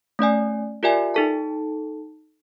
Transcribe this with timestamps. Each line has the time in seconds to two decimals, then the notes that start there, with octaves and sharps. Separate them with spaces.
0.19 A3 C#4 D5 G#5
0.83 F4 G4 A#4 D5 E5 G#5
1.14 D#4 A4 A5